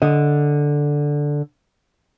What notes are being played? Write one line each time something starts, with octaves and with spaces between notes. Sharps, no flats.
D3 D#5